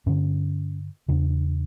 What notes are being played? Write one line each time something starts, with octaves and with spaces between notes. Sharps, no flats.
G2 D3 C#4
E2 C#3 D4